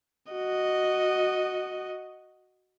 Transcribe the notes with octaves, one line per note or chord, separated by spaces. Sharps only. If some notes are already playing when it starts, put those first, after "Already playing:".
F#4 D#5